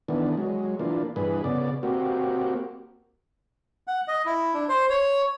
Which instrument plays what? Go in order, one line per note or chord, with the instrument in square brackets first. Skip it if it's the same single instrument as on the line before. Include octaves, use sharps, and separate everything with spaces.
[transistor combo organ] D#3 E3 B3 D4
F#3 G#3
E3 A#3 D4 F4
G2 E3 G#4 B4
C#3 B3 D5
A#3 C4 F#4 G4
[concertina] F#5
D#5
E4
D4
C5
C#5